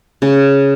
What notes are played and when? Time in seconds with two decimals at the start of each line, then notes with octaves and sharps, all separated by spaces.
0.22 C#3